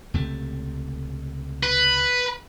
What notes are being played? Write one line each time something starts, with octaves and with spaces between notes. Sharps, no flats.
C#2 C3 A3
B4